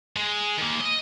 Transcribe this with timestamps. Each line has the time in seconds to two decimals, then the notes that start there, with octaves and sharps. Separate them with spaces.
0.16 G#3
0.58 D#3 A#3
0.81 D#5